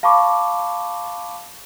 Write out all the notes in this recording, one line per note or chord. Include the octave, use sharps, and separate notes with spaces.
F5 A5 B5 C#6 D6